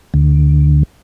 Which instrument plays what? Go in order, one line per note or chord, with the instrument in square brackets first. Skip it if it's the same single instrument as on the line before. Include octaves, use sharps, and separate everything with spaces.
[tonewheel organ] D2